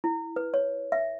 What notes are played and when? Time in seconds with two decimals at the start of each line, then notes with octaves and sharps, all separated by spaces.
0.04 E4
0.36 B4
0.54 C#5
0.92 E5